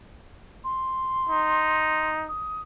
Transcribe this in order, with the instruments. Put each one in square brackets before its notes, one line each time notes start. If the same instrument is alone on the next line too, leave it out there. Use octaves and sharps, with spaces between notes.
[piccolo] C6
[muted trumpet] D#4
[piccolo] D#6